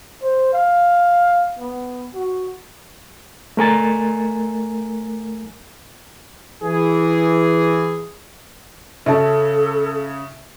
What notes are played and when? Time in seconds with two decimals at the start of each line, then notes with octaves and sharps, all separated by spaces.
0.22 C5
0.53 F5
1.59 B3
2.15 F#4
3.57 A3 A#4 G#5 A6
6.62 E3 G#4
9.06 C#3 C#4 A4 E5 A5